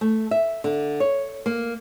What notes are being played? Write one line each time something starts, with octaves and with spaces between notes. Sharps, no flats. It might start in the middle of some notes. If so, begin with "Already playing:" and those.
A3
E5
D3
C#5
A#3